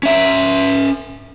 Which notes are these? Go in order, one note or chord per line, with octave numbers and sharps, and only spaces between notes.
C#4 E5